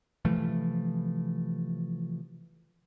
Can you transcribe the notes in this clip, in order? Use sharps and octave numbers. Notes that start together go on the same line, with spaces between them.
C3 E3 F3 A3